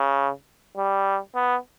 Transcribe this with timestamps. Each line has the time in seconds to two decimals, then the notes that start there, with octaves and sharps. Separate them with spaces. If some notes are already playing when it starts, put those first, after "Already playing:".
Already playing: C#3
0.77 G3
1.35 B3